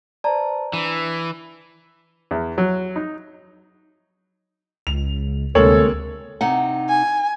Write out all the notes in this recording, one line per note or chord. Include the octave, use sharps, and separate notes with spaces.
B4 C5 D5 A5 A#5
E3 D4
E2
F#3
D#4
C#2 F7
D2 C3 G#3 A#3 G#4 A4 C#5 F#7
C3 D#4 F#5
G#5